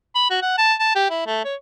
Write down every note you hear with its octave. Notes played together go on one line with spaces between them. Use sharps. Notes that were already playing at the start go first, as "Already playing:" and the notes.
B5
F#4
F#5
A5
A5
G4
E4
A3
C#5